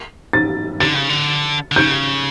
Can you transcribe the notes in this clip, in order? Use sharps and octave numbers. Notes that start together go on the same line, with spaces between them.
A6
D3 A6
C#3
D3
D3
C#3 G6